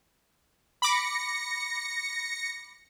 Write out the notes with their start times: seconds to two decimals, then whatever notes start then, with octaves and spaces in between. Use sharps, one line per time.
0.82 B5 D6 A#6 C#7